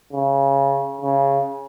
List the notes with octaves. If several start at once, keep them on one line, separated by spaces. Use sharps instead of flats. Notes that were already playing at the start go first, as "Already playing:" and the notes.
C#3
C#3